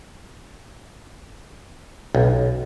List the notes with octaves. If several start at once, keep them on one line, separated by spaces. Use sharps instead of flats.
B1